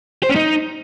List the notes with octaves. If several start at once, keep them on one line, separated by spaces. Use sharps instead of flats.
C5
C#4
D#4